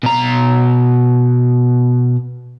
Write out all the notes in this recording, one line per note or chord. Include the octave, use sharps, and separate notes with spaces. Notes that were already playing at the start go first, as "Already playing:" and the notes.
B2 A#5